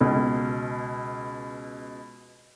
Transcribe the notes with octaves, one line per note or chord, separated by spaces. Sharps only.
C#2 B2